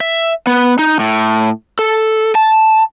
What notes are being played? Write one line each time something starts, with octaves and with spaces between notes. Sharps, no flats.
E5
B3
D#4
A2
A4
A5